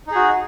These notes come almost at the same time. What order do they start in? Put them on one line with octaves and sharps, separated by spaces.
D#4 G#4 F#4